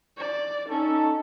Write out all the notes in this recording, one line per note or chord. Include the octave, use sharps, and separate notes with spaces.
D5
C#4 D#4 A4